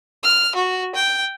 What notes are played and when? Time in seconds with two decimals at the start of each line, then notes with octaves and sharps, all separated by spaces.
0.23 F6
0.55 F#4
0.95 G5